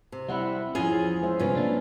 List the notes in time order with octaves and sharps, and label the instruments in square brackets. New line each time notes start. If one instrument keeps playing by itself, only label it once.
[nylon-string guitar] C3
[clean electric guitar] G3 C4 E4 [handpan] E5 F#5
[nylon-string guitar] E2 F4 G#5 [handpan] F3 C#4 [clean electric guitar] G#4
[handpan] G#3 C5 E5
[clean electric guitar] G2 C3 [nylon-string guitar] C#4 F4 B4
[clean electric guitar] A#3 D4